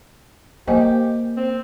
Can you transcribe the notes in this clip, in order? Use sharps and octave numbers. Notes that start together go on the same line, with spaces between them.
A#3 G4 C5 D#5 G#5
C4